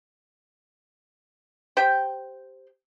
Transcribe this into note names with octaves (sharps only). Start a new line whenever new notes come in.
G4 C5 G5